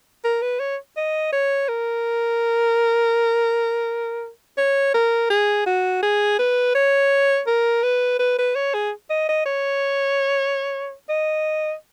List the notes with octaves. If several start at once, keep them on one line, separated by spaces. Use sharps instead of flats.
A#4
B4
C#5
D#5
C#5
A#4
C#5
A#4
G#4
F#4
G#4
B4
C#5
A#4
B4
B4
B4
C#5
G#4
D#5
D#5
C#5
D#5